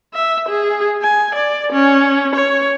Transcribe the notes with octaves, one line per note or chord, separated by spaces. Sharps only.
E5
G#4
G#5
D5
C#4
C#5